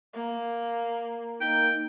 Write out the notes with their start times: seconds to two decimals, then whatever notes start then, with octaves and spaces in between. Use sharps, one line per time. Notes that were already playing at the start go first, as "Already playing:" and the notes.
0.14 A#3
1.41 A#3 D#4 G5